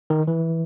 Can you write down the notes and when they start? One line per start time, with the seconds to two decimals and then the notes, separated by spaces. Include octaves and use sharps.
0.10 D#3
0.27 E3